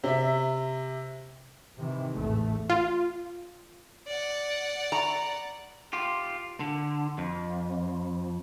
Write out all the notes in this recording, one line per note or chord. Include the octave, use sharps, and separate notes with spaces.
C3 E5
C3 D#3 E3
A1 E2 G#2 A3
F4
D5 F#5
A#5
F4 G4
D3
F2